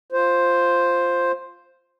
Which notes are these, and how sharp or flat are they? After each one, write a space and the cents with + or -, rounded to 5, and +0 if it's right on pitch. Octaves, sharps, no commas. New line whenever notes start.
F4 +0 C5 +5